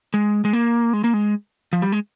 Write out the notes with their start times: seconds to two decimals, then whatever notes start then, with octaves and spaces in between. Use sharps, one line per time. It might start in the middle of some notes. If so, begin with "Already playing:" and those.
0.14 G#3
0.45 G#3
0.53 A#3
0.93 G#3
1.04 A#3
1.14 G#3
1.73 F3
1.82 G3
1.92 G#3